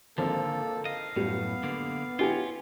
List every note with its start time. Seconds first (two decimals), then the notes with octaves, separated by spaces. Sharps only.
0.18 G#1 D3 F3 A#3 C4 A4
0.85 D#5 F5
1.16 F#2 A2 G3 B3
1.63 D3 A#3
2.19 C#4 E4 F4 G4 G#5